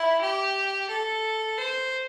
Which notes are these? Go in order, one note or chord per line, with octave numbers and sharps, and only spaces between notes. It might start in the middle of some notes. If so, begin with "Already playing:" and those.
Already playing: E4
G4
A4
C5